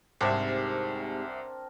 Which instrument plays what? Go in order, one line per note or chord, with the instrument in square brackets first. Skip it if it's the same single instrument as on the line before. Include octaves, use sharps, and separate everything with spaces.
[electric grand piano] C2 E5 [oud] G#2 C3 [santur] C4 D4 A#4